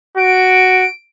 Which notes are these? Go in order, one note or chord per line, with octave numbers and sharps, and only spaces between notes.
F#4 D7